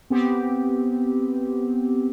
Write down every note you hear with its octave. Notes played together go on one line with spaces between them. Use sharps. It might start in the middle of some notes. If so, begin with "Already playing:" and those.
B3 C4 G4